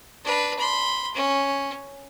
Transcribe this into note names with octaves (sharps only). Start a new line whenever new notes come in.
D4 B4
B5 C6
C#4